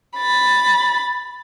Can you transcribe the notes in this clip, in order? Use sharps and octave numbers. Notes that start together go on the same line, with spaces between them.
B5 A6